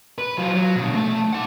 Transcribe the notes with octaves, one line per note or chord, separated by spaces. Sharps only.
B4
F#3 F4
F#3
B2 D3
A3 A5
D#4 F#5